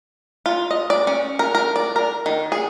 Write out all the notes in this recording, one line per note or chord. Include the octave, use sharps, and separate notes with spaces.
F4
D#5
D5
C#4
A#4
A#4
D5
A#4
D#3
G#4